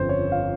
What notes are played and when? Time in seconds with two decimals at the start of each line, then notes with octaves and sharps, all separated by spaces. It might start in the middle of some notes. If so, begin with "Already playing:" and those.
Already playing: G1 F2 C#3 C5
0.09 C#5
0.32 F5